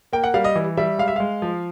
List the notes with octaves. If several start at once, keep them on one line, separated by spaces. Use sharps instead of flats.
A#3 G5
F#5
G3 F5
D#5
E3
G3 E5
G#3 F5
E5
G#3 F5
F3